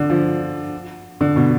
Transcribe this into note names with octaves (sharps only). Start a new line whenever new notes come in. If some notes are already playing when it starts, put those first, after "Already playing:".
Already playing: D3
F3
D3
B2